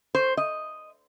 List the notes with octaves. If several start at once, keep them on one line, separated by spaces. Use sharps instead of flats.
C5
D#5